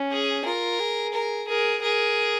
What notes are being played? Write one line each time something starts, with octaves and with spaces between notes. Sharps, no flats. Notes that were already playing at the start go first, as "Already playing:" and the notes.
Already playing: C#4
G#4
F4 A#4
G#4
A#4
G#4 A#4
G#4 A#4